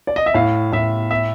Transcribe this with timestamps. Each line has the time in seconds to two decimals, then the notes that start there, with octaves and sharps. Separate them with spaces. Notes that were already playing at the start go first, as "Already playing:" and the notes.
0.07 D5
0.16 D#5
0.26 E5
0.34 A2 F5
0.72 A2 E5
1.11 E5